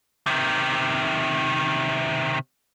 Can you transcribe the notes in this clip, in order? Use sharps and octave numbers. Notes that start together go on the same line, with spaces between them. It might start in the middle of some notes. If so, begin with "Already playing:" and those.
C3 D#3